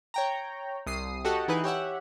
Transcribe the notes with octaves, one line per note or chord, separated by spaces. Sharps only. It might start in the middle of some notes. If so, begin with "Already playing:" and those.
C#5 G5 A#5
C2 D#6 C7
F#4 G4 A4 D#5 F#5
E3 D#4 E4 G#4 B4
G4 C#5 E5 F#5